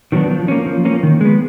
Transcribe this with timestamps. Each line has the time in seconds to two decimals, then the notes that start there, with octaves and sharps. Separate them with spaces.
0.12 D#3 F#3 B3 D4
0.30 F3
0.48 A#3 C#4
0.66 F3
0.85 A#3 C#4
1.03 D#3
1.21 G#3 B3